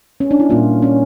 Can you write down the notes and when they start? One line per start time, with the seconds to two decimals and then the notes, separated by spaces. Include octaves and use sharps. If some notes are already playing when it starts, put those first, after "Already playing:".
0.20 C#4
0.31 D4
0.40 E4
0.50 A#2 G3 A#3 F4
0.82 C#4